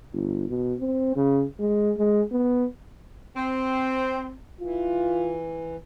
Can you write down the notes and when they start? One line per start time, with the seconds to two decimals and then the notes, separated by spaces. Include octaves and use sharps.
0.13 G1
0.49 B2
0.80 C4
1.16 C#3
1.59 G#3
1.98 G#3
2.32 B3
3.36 C4
4.61 E3 F4